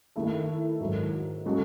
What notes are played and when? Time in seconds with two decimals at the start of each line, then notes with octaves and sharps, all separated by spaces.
0.16 D#3 A3 E4 A4
0.81 G#2 D#3 F#3
1.45 C#3 G#3 D#4 F#4 A4